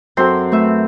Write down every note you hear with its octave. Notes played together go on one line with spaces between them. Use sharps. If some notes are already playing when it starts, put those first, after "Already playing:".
F#2 C4 F#4 A4 C6
A3 B4 E5